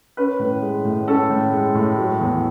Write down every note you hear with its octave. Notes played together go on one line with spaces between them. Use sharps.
C#4 B4
A2
G#3
A2
C#4 A4
A2
G#3
A2
F#3
E2